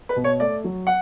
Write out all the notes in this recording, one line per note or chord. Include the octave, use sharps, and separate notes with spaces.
B4
B2
C#5
A3 D5
F#3
F#5